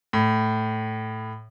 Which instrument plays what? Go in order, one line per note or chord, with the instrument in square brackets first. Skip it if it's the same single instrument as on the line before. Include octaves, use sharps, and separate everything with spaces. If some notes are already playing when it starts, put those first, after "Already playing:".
[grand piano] A2